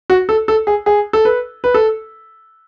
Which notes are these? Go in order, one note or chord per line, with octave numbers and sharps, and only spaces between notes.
F#4
A4
A4
G#4
G#4
A4
B4
B4
A4